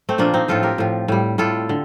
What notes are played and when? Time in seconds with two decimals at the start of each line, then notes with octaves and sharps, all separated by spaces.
0.09 A3 C4
0.18 A#2 F3 A#3 D4
0.34 C4 D#4
0.48 A2 F3 F4 A4
0.63 G4 A#4
0.78 A2 F3
1.08 A2 G3
1.38 A2 G3 F4 A4
1.69 D3